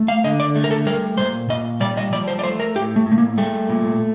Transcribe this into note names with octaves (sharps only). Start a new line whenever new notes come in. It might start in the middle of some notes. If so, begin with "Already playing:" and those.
Already playing: A3
F5
D3 D#5
D5
A3
A#4
A4
G3 A#4
A#2 C5
A#2 D#5
G3 D5
D#5
F3 D5
C5
D5
A3 C5
A#4
A2 G4
A3
A2
A3
A#3
G3 A3
A#2